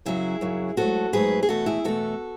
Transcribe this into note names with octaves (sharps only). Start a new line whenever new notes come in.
F#2 C#3 F#3 E4 G#4
F#2 C#3 F#3
G#2 F#3 A3 F#4 A4
G#2 F#3 A3 G#4 B4
G#4
E2 B2 A3 F#4 A4
E4 G#4
E2 B2 A3 F#4 A4